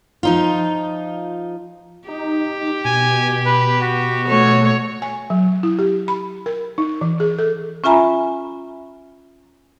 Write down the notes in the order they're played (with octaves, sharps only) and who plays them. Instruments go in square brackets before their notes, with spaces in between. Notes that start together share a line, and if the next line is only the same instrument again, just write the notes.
[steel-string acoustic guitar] F3 D#4 F4
[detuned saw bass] D#4 [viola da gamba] G4
[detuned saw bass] B2 [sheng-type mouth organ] G#5
[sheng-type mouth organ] B4
F#4
[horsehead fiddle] A3 [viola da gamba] C#5
[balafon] G#5
F#3
E4
G4
B5
A#4
D#4
E3
G#4
A4
[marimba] C#4 F4 E5 G#5 A#5 B5